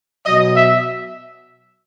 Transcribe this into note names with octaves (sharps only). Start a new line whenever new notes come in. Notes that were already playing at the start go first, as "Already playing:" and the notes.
B2 F#3 D#5
E5